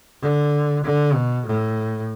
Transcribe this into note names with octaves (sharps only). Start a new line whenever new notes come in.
D3
D3
B2
A2